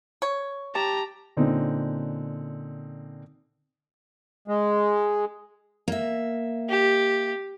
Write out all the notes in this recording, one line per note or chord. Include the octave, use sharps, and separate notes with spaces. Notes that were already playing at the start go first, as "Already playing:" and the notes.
C#5
G4 A5 A#5
A#2 D3 C4 C#4 D#4
G#3
A#3 E5
G4